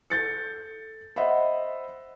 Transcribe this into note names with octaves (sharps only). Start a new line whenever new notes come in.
A4 G6 A6 C#7
C5 D#5 E5 F#5 B5